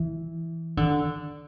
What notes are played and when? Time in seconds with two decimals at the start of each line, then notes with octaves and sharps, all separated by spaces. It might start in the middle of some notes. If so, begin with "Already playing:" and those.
Already playing: E3
0.77 D3